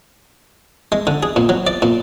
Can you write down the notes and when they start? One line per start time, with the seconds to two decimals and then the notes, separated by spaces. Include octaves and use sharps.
0.92 G#3
1.07 D3
1.23 G#4
1.36 A#2
1.49 F#3
1.67 D5
1.82 A#2